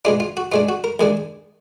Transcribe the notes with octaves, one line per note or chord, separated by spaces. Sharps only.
B2 G#3 D4 F4
F4
F#4
B2 G#3 D4 F4
F#4
A#4
D#2 D#3 G#3 D4